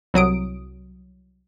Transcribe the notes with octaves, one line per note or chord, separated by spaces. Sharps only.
C2 F#3 D#6 D7